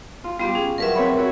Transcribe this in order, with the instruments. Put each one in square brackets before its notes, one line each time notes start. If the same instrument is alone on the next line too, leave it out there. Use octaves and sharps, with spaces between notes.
[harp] F4
[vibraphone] G3 B3 [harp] F4 G4
[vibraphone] C#4 [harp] G#4
[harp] G2 F#3 [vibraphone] A#4 B4 E5
[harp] C4 C#5 B5
E4 F#4 C#5